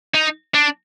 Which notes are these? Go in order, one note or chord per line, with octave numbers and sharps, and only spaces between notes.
D#4
D4